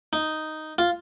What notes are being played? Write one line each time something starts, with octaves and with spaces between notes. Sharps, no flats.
D#4
F4